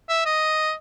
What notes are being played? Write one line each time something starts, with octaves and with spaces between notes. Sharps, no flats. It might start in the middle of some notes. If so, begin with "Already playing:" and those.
E5
D#5